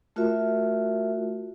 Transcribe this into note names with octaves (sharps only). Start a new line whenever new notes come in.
A3 F4 F#4 A#4 E5